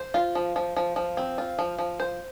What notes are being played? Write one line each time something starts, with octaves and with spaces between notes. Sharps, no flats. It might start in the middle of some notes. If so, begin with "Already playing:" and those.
Already playing: C5
F4
F3
F3
F3
F3
C4
F4
F3
F3
C5